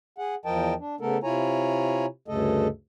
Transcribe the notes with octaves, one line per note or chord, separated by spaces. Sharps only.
G#4 F#5
E2 F3 A#4 D#5 G5 A5
D4
C#3 A3 B3 A4 A#4
C3 E4 F4 C#5 G#5 A#5
D2 G2 C#3 A3 A4 D#5